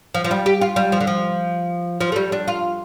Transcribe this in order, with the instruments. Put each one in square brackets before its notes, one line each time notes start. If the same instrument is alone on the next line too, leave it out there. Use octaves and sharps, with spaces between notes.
[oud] F3
F3
G3
G4
F4
G3
F3
D3
F3
F3
A3
G3
D4
F4